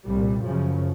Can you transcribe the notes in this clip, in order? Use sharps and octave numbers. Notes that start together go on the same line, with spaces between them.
C2 A#2 G3
F#2 C#3 F3